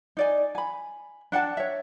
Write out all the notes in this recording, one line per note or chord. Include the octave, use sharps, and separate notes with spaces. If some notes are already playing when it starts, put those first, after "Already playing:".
D#4 D5 G#5
G#5 B5
D4 F#5 G5 A5
C#5 E5